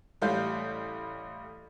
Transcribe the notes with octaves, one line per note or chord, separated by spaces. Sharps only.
A1 G3 A3 F5 G6